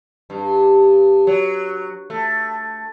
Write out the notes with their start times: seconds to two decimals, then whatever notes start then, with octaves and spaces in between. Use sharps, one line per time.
0.30 G2
1.27 F#3
2.10 A3